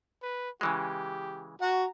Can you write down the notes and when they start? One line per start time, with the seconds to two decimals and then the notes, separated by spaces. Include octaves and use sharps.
0.22 B4
0.61 C#3 E3 G#3 G4
1.62 F#4 F#5 A#5